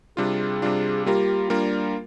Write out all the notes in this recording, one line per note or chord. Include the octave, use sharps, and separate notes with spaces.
C3 G3 D4 F4 G#4
C3 G3 D4 F4
G3 A#3 F4 G4 A#4
G3 A#3 D4 F4 A#4